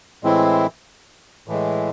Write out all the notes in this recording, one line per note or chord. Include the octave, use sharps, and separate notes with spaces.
A2 E3 G#3 C4 E4
A2 E3 G#3